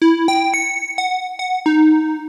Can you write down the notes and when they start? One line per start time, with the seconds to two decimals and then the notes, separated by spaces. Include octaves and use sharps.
0.02 E4
0.28 G5
0.54 C#7
0.98 F#5
1.39 F#5
1.66 D#4